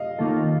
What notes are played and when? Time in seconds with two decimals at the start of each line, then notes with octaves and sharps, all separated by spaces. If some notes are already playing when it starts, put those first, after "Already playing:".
Already playing: D#5 F5
0.19 D#2 D#3 A#3 F4 A4